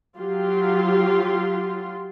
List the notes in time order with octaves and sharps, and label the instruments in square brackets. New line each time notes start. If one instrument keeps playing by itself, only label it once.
[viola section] F#3 F4 G4 C6